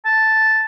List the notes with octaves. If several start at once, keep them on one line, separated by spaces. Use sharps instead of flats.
A5